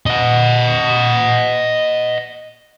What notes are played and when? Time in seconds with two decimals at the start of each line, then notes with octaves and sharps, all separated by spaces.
0.06 D#5 F#5